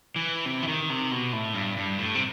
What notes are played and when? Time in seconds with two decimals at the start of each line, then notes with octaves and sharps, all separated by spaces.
0.16 E3
0.46 C3
0.62 E3
0.67 D#3
0.90 C3
1.11 B2
1.33 A2
1.55 G2
1.77 G2
1.98 A2
2.15 C3